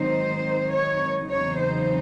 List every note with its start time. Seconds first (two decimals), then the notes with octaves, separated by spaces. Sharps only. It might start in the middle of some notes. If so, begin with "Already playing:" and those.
Already playing: G#2 D#3 F#3 C4 D#4 C5
0.74 C#5
1.29 E2 C#3 F#3 C4 D#4 C#5
1.57 C5